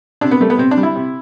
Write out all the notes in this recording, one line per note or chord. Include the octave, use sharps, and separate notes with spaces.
C3 D4
B3
G3 A3
B3
C3 C4
D4
G3
E4
C3